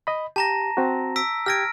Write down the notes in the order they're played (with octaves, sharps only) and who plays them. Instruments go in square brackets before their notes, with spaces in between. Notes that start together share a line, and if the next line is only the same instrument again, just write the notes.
[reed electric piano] D#5 B5
[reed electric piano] G4 [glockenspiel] A5 A#5 A#6
[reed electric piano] C4 F#4
[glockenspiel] E6 B6 D7
[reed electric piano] G4 G5 G#6 [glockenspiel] F6 A#6 D7